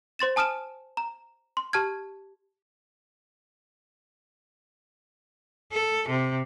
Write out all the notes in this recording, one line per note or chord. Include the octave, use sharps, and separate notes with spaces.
C5 C6 A6 E7
G#5 A5 D#6 F6 D7 E7
A#5
C6
G4 A5 F6 G#6
A4
C3